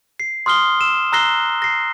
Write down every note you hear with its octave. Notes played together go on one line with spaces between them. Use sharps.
C7
C6 D#6 F6 C7 G7
E6 E7
A#5 E6 F#6 A#6 C7 G7
A#6 C7